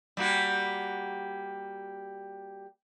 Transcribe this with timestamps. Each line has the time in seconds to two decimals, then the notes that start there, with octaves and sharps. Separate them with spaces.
0.17 G3 A#3 F#4